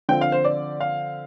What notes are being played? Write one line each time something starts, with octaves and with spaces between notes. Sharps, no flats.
D3 F3 C4 G5
F5
C5
D5
F5